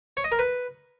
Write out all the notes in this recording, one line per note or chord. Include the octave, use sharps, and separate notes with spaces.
C#5
D#5
A#4
B4